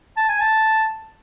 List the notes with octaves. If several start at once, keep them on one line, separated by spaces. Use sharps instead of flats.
A5
G#5
A5